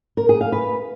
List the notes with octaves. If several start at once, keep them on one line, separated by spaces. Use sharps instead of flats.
A#4
G#4
F5
B4